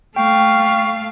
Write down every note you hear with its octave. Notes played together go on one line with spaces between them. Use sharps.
A3 F5 G5 C#6